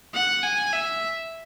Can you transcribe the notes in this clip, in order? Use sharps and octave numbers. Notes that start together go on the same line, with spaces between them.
F#5
G#5
E5